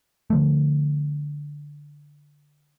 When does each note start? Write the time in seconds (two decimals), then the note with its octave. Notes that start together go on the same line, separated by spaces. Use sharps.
0.30 D3 F3 A3